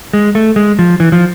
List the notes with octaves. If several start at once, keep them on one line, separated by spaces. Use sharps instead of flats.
G#3
A3
G#3
F3
E3
F3